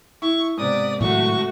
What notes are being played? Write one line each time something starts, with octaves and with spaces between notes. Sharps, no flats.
E4 C#6
G#2 C3 B3 D5 D#6
A2 D#3 F#3 A3 F#4 C#6